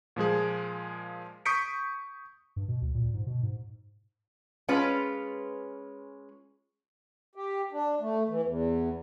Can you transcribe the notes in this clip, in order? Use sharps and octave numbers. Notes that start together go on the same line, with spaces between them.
A#2 F3 G#3 G#4
C#6 D#6 G6 B6 C#7 D7
G2
B2
D2
A#2
G#2
B2
G#2
G#3 C#4 F4 B4
G4
D4
A3
E3
E2